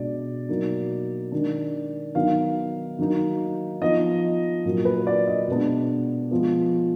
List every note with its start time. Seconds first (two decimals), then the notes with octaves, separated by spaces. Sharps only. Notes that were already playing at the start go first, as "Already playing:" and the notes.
Already playing: B2 G#3 D4 D5
0.49 B2 F#3 A#3 D#4
1.32 D#3 G#3 D4
2.15 D#3 F#3 B3 D#4 F5
2.99 D#3 F#3 A#3 D#4
3.81 F3 B3 D#4 D#5
4.65 A#2 F#3 A#3
4.85 B4
5.07 D5
5.27 D#5
5.48 B2 G#3 B3 D4
6.31 F3 G#3 B3